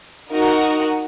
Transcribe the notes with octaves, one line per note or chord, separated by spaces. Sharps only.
D#4 F#4 A#4 D#5 F#5